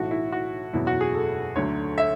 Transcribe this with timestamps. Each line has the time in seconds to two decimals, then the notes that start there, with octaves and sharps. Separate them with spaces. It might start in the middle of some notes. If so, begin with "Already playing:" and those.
Already playing: B1 A2 E3 F#4
0.11 E4
0.32 F#4
0.73 F#1 E2 B2 F#3 E4
0.87 F#4
1.01 G#4
1.14 A4
1.56 D2 D3 F#3 C#5
1.98 E5